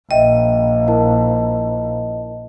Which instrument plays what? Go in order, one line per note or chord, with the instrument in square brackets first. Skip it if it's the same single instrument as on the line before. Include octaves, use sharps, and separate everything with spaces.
[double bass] A#1 [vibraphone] D#5 [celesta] E5 G5
[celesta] E4 A#4 A5